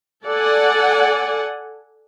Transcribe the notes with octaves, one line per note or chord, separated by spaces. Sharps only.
A4 D5 F#5 G#5